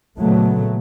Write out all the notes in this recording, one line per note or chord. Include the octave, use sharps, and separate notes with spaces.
A#2 C#3 F#3 A3 B3